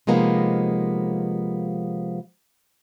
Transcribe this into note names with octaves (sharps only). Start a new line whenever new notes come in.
C3 F3 G#3 A#3 B3 D#4